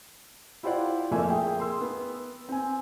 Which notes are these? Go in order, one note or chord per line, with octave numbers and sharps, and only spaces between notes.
E4 F4 G4 C5 D5 F#5
F2 F3 A3 A#3 E5 G#5
G#4 E5 G5
A#4 C6 E6
B3
C4 G#5